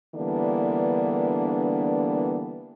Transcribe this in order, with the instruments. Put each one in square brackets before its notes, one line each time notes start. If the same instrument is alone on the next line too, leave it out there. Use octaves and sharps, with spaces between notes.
[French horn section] D3 E3 G3 A#3 B3 D4